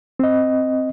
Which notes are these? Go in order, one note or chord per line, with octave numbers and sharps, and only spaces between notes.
C4 D#5